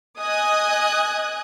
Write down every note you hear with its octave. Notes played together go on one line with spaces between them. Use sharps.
D#5 G#5 D#6 F#6 G#6